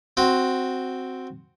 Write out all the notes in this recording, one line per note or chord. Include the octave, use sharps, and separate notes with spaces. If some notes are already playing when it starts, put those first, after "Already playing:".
C4 F#4